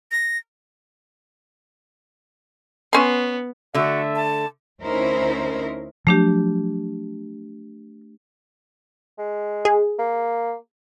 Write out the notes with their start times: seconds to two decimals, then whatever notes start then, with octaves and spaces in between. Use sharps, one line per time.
0.12 A#6
2.93 B3 C#4 C6
3.74 D3 A3 F#4 E5
4.16 A5
4.81 D2 C#4 D#4 E4 A#4 C5
6.07 F3 F#3 A3 D4 G4
9.18 G#3
9.65 G#4
9.99 A#3